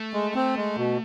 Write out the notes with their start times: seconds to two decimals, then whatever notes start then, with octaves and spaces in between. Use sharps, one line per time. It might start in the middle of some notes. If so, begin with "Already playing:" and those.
Already playing: A3
0.14 G#3
0.35 C4
0.56 G#3
0.78 B2